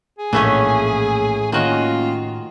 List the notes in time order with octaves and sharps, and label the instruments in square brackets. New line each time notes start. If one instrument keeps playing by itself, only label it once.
[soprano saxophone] G#4
[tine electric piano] A#1 A#3 B6 [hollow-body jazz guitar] A2 [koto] E3 A3 C#4
[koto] D#3 F#4 D#5 [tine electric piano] A#3 C#4 [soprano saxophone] F4